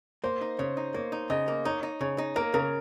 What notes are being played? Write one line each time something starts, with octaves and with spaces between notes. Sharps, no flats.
A#3 C5
D#4
C#3 C#5
D#4
A#3 C#5
D#4
C#3 D#5
A#3
D#4 C#5
D#4
C#3 C#5
D#4
A#3 A#4
C#3 A#4